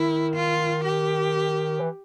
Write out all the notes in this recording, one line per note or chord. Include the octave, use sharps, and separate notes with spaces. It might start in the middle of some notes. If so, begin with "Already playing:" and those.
Already playing: D#3 E4
F4
G4
E3